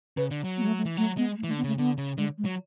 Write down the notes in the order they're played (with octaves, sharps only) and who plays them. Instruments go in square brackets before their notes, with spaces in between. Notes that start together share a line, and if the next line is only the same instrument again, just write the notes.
[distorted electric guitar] C#3 [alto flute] B4
[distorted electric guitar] D3
F#3
[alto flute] B3
G#3
A3
A3
[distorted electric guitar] E3
[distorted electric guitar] F#3 [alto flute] A3
[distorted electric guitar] G#3 [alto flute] B3
[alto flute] A3
[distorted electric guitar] E3
[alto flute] A3
[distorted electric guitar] D3
[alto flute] B3
[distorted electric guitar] C#3 [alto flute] A3
[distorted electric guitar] D3 [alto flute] B3
[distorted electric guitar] C#3
[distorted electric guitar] D3 [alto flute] G#3
[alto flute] G#3
[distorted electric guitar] F#3